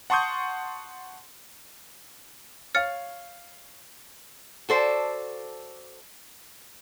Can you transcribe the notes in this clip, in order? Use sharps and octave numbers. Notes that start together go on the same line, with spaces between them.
F#5 A5 C6 C#6 D#6 G6
C#5 F5 F6 A6 C#7
F#4 A4 C5 D5